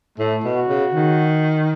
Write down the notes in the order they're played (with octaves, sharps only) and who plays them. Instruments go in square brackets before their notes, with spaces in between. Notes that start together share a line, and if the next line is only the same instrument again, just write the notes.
[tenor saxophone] A2 [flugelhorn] A3
[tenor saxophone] B2
[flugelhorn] F#4
[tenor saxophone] C#3
D#3